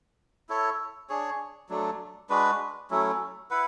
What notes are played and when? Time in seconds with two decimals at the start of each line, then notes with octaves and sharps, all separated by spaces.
0.49 E4 A4 C#5
1.09 D4 G#4 C#5
1.69 F#3 A3 D4
2.30 G#3 D4 F#4 B4
2.90 F#3 A3 C#4 E4
3.51 E4 B4 F#5